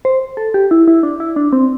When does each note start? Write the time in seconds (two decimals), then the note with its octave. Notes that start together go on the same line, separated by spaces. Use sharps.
0.05 C5
0.37 A4
0.54 G4
0.71 E4
0.88 E4
1.03 D4
1.20 E4
1.36 D4
1.53 C4